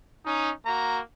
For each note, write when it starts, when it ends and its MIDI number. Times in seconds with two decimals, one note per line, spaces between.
0.25 0.50 61
0.25 0.50 63
0.66 0.99 58
0.66 0.99 66
0.66 0.99 82